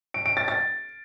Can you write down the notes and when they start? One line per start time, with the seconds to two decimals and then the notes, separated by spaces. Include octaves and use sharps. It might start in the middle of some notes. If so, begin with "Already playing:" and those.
0.14 D7
0.26 D7
0.37 A6
0.48 A6